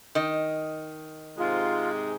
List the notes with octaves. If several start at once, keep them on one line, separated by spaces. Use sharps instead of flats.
D#3 D#5
G#2 C3 G#3 F4